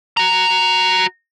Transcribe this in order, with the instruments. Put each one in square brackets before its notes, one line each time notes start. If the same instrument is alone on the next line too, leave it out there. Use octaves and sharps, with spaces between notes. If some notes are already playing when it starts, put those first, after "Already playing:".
[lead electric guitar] F#4 A#5